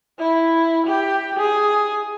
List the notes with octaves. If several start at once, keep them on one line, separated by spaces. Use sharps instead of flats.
E4
G4
G#4